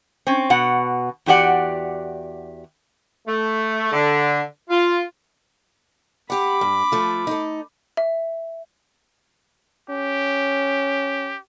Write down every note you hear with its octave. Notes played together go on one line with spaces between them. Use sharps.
C4 C#4
B2 F#5
E2 F#4 G4 D5 F#5
A3
D3
F4
G4 F#5 B5 D6
G2
F3 A3 F4
D#4 A4
E5
C#4 G4